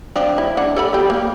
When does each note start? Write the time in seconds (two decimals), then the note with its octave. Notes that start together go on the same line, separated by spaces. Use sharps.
0.16 F3 C4 D4
0.38 E4
0.57 D4 F#5
0.76 A4 D5 B5
0.93 B3 G4
1.10 A#3